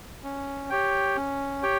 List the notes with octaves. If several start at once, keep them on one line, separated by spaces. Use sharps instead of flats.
C#4
G4 C#5 G5
C#4
G4 C#5 G5